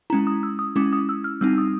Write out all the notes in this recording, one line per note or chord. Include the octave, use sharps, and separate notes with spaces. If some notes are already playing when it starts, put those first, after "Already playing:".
G#3 C#4 E4 A#5
D#6
E6
D#6
G#3 C#4 E4 D6
D#6
E6
F6
G3 C4 D#4 E6
D#6